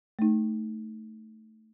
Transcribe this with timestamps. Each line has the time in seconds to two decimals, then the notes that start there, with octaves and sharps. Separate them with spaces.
0.19 A3 D#4